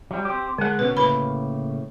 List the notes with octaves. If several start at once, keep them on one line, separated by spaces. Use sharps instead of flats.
F#3 G3
C4 G4
D3 G#3 F#5
B2 C#4 F#4 B4
A2 C#3 A#3 B4 B5